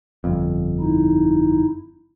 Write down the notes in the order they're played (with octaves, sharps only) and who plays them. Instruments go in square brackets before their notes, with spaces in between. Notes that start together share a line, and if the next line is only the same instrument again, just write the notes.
[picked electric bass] G1 F2
[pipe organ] D#4 E4